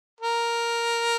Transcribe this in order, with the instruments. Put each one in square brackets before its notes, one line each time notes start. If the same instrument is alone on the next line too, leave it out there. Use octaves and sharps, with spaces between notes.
[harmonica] A#4